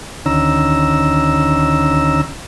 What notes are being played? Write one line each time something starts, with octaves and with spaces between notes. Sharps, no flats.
D2 D#3 C#4 A#5 E6